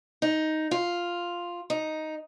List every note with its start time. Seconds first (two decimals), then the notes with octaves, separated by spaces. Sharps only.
0.22 D#4
0.71 F4
1.70 D#4